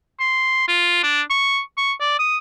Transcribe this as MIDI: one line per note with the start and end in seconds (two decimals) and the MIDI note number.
0.20 0.65 84
0.68 1.03 65
1.03 1.21 62
1.30 1.60 85
1.78 1.93 85
2.00 2.18 74
2.19 2.38 87